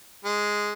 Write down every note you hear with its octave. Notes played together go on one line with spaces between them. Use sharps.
G#3